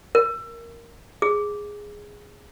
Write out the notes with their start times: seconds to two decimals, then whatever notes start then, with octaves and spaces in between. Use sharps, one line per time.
0.15 A#4
1.22 G#4